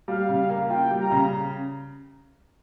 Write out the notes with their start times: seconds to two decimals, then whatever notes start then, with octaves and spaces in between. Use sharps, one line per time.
0.08 G3 F5
0.29 C#3
0.49 A#3
0.70 F4 G5
0.91 G3
1.01 A#5
1.11 C#3